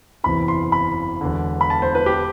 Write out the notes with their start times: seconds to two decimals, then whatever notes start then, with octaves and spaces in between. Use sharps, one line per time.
0.24 F#1 E2 C3 E3 B5
0.48 C6
0.72 B5
1.21 E1 E2 D3
1.61 B5
1.70 A5
1.82 C5
1.95 B4
2.06 G4